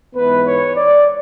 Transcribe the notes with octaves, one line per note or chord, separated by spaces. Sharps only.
G#2 E3 B3 E4 B4
C#5
D5